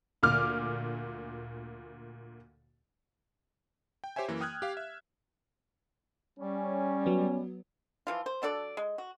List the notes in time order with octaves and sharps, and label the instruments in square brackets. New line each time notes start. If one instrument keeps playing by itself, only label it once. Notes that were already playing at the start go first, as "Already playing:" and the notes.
[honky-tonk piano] D2 A#2 D6 F6
[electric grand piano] G5
G4 C5 C#5 E5 G#5
F#2 E3 A#3
G5 D#6 F6 F#6 G#6
G4 F5
E5
[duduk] G3 [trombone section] C#4
[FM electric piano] F#3 B3
[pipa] E3 F3 F4
C5
F#3 D4 A4 D5
G#3
F#4